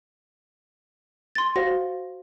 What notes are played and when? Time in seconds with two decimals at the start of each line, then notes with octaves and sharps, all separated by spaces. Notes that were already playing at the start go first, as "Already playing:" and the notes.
1.35 C6 A6
1.56 F#4 C5 F5 A#6